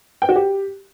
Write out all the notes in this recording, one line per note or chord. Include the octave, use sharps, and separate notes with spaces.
G5
F#4
G4